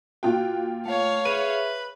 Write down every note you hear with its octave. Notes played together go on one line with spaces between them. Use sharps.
A#2 F4 F#4 G5
A3 C#5 F5
G#4 B4 E5 D#7